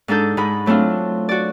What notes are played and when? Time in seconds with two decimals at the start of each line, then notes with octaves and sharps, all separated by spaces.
0.08 G#2 D4 D#4 A4 G6
0.37 G#2 G#3 G#4 B5
0.66 F#3 A3 C4 D4 F4
1.29 F#4 D5